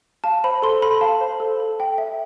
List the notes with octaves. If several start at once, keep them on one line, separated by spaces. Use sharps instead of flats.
F5 A5
C5 B5
A4 C6
A4 B5
F5 A5
C5
A4
A4
G5
E5